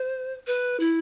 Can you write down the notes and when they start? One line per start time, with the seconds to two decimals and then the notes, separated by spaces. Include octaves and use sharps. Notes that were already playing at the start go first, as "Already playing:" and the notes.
Already playing: C5
0.47 B4
0.80 E4